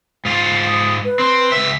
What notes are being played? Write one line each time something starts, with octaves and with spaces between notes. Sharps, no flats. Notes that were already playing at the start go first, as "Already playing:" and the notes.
G#2 F4
D#6
B4
C4
C#2 E5